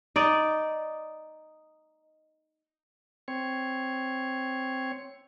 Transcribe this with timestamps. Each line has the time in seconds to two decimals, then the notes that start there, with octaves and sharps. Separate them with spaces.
0.16 D#4 D5
3.28 C4 C#5